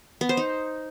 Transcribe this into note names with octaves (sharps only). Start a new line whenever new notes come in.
B3
C5
D#4